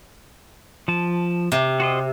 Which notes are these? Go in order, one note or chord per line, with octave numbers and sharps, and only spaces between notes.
F3 A5
C3
F#4 C5 D#5